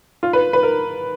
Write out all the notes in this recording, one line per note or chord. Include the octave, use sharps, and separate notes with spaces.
F4
B4
B4
A#4